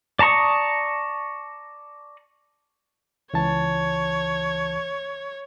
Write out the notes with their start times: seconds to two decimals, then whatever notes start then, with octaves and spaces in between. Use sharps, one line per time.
0.19 D5 A5 A#5 C#6 D#6
3.33 C#2 E3 C#5 A5